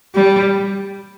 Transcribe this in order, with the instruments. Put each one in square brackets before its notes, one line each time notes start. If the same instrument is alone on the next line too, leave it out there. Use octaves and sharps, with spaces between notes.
[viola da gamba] G3